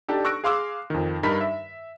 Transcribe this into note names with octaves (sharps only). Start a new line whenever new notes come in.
D4 D#4 G4 A4
C#6 E6 F#6 A#6 D7
G#4 F5 C6 D6 E6
F2 D#3
G2 D#4 A#4 B5 B6
E5